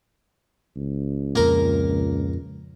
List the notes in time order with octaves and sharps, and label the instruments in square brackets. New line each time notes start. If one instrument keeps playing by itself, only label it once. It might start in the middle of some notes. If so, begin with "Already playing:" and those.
[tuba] C#2
[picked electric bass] F2 A#2 [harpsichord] A#3 A#4